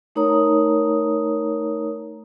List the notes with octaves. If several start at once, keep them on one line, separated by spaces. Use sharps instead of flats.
A3 D#4 A#4 C#5 A#5 D#6